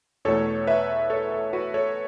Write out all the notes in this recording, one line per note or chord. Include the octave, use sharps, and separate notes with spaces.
E2 B2 A3 A4 C#5
B4 E5
A4 C#5
A4
F#4 B4
A4 C#5